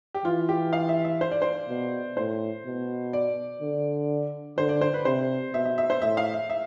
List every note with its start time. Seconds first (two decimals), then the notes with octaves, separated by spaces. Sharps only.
0.14 G4
0.25 E3 F4
0.49 G4
0.73 F5
0.89 E5
1.05 E5
1.21 C5
1.31 D5
1.42 C5
1.69 B2
2.17 A2 C5
2.65 B2
3.13 D5
3.61 D3
4.58 D3 C5
4.69 D5
4.81 C5
4.94 B4
5.05 C3 C5
5.54 B2 E5
5.65 E5
5.78 E5
5.90 C5
6.02 A2 E5
6.17 F5
6.34 E5
6.50 E5